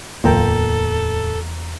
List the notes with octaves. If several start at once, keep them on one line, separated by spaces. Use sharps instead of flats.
D1 E2 A#3 F4 A4 G5 A#5